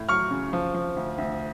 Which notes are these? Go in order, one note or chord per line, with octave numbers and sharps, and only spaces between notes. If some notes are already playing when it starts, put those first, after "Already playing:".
Already playing: A2
F#3 C#6 F6
C#3
F3
F3
D2
D2